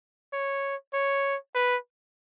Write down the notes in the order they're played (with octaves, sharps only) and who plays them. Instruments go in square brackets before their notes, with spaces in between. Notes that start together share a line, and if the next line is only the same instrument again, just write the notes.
[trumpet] C#5
C#5
B4